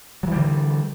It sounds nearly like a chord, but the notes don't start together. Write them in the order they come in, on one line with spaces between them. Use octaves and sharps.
F#3 E3 G3 D3